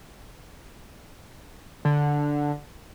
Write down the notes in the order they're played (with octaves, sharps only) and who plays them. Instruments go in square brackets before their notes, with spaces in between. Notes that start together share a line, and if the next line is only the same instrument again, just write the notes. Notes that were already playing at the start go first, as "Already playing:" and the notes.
[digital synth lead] D3